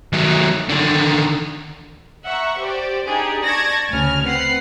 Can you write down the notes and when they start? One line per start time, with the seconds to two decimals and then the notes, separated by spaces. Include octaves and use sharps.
0.13 D#3 F#3
0.69 D3 D#3
2.24 E5 F#5 A#5 C#6
2.58 G4 C5 D5
3.07 D4 D#4 G4 G#4
3.44 D5 A5 C#6 G#6 A#6 C#7
3.89 D2 C#3 G#5 F6
4.25 C4 B4 F#5 F#6 C7